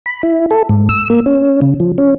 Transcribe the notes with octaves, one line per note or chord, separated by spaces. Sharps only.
B5
E4
A4
G#2
E6
A#3
C#4
C#3
F3
C#4